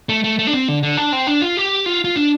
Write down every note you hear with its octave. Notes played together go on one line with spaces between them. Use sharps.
A3
A3
A3
D4
C4
D3
D3
D4
C4
D4
F4
G4
F4
F4
D4